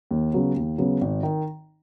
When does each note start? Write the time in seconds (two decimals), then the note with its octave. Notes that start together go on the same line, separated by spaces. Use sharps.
0.11 D#2
0.33 C#3 F#3 B3
0.56 D#2
0.78 C#3 F#3 B3
1.01 G#1
1.23 D#3